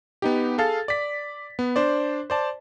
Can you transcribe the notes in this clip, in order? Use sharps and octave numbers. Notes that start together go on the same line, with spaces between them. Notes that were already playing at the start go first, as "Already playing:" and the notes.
B3 D#4 G4
G#4 A4 F5 A6
D5 B6
B3
D4 C5 D5
C5 D5 A5